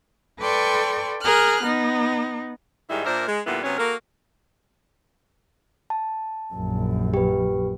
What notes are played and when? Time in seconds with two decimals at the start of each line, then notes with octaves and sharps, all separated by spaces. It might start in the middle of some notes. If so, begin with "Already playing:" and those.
0.40 A4 B4 D5 G5 C6 C#6
1.22 G#4 A#4 F6 F#6
1.64 B3 D#4
2.90 G#2 D#3 G3 G#3 E4
3.05 A#2 D4 A#4 C5 E5
3.28 G#3
3.45 A#2 D3 G3 B3 E4
3.64 C3 F#3 B3 C#4
3.78 A#3 F#4 A4 A#4
5.90 A5
6.54 A#1 F#2
7.14 G4 B4